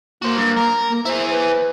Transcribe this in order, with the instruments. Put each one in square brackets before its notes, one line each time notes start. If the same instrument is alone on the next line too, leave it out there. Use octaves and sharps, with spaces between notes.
[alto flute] A#3 [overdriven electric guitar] F#4 C5
[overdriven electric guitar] G2
A#4
[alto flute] A#3
[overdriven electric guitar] E4 G#4 [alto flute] C5
[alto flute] B4